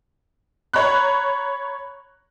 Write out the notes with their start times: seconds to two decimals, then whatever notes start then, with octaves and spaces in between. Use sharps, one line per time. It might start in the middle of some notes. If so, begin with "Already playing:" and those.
0.73 C#5 A#5 B5 F#6